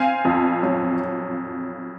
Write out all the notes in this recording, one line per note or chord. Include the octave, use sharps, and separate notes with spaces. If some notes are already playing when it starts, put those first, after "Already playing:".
Already playing: C4 F5 G#5
F2
F#3